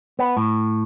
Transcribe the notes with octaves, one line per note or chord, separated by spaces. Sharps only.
B3
A2